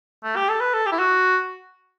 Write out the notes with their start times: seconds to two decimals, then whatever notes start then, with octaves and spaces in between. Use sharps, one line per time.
0.24 A3
0.36 G4
0.49 A4
0.60 B4
0.73 A4
0.86 G4
0.92 E4
0.99 F#4